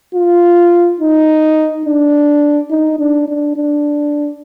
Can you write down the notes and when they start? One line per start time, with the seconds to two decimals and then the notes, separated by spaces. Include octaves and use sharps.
0.14 F4
1.00 D#4
1.85 D4
2.71 D#4
2.99 D4
3.28 D4
3.56 D4